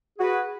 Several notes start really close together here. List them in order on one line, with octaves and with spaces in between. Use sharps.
G#4 F#4 B4